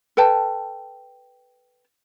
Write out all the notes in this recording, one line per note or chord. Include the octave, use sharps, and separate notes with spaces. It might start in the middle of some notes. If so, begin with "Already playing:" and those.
A4 B4 G5 A5